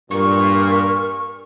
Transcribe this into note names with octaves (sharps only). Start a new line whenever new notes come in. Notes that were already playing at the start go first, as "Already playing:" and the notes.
G2 A#2 A#4 C#6